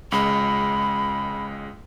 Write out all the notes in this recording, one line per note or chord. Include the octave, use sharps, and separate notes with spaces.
C#2 G#3 B5